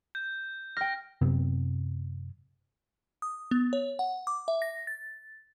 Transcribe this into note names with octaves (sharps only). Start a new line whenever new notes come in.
G6
G5 F6 A#6
F#2 C3 B3 C4
D#6
B3
C#5
F#5
D6
E5
A#6
A6